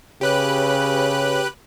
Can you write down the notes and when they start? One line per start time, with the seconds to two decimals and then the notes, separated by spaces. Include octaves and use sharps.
0.21 C#3 G4 B4 C#5 F#6